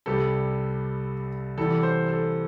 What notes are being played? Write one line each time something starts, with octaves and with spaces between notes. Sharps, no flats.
C2 C3 G3 A4
E2 C3 E3 G3 A4
C5
A4